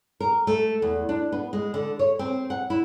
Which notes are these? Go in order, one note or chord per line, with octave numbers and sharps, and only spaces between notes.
A#4
A3
E2
D4
B3
G#3
D3
C#5
C4
F#5
E4